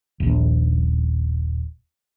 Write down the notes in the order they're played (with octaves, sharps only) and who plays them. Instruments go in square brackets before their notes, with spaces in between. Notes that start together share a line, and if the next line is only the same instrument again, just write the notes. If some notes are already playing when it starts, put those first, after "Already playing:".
[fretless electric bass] D#1 A#1